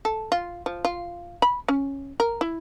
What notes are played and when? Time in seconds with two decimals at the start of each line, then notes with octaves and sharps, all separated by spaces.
0.05 A4
0.32 F4
0.66 F3
0.85 F4
1.42 B5
1.68 C#4
2.20 A#4
2.41 E4